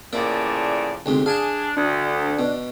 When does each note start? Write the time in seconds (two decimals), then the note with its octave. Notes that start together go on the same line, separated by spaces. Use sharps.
0.13 A2 C#3 F3 A#3 D5 E5
1.06 D2 G#2 C3
1.26 D4 G#4 F5 G#5 A5
1.77 D2 D4
2.39 B2